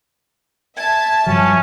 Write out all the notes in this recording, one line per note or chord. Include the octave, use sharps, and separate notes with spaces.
E5 A5 G#6
G2 F3 F#3 C#4 G#5